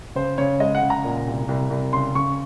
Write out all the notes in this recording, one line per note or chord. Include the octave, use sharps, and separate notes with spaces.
C#3 C5
C#3 C#5
G#3 D#5
F#5
C#3
A#5
A#2
C2
C2
C2
C#3 C6
C#3 C#6